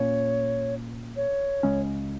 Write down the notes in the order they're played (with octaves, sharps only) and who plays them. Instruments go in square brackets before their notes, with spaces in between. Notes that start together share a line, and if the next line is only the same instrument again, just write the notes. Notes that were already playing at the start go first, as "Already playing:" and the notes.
Already playing: [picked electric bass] A#2 A#3 C#4 [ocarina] C#5
[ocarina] C#5
[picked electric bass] C#2 C#3 G#3 C#4